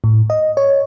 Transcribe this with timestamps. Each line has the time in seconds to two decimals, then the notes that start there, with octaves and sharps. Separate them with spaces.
0.04 A2
0.30 D#5
0.57 C#5